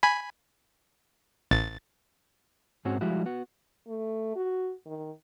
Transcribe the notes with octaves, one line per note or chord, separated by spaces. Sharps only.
G#5 B5
A1 A6
G#2 G#3 C4 C#4 F#4
F3 G3 G#3 E4 F#4
B3 F#4
A3
F#4
D#3